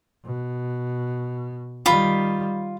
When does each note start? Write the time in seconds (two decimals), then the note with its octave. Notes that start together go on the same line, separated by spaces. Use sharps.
0.24 B2
1.86 D#3 G3 F4 B5